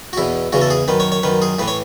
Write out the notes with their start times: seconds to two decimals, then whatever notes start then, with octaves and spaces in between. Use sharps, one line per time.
0.13 F#4
0.17 E2 B2 E4
0.52 E2 C#3 E3 F#4
0.62 A4
0.70 G#4
0.88 F#2 D#3 B4
1.00 C#5
1.12 C#5
1.23 F#2 D#3 B4
1.42 G#4
1.59 A2 E3 B4
1.68 C#5